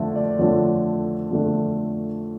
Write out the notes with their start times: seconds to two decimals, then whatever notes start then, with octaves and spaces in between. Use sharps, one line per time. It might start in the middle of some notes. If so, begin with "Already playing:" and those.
Already playing: F2 D3 F3 A3 E5
0.16 D5
0.39 F2 D3 F3 A3 D4 C#5
1.32 F2 D3 F3 A3 D4